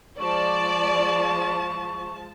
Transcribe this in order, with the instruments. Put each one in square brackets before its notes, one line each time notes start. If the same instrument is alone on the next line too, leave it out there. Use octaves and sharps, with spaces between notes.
[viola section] F3 G#3 A5 [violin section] D5 [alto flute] C#6